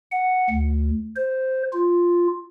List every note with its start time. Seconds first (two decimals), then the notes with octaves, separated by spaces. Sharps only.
0.11 F#5
0.50 D2
1.16 C5
1.72 F4